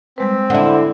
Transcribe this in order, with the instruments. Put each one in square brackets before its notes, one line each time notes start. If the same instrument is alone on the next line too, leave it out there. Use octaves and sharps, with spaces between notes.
[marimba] G3 G#3 B4 [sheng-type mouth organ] C4
[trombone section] D3 [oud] B3 E4 [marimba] F#5